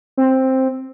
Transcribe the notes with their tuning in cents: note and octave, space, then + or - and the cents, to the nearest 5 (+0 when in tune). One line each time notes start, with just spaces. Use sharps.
C4 +5